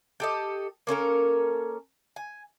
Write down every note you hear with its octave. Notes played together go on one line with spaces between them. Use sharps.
G4 A4 D#5
A#3 C#4 A4 A#4
G#5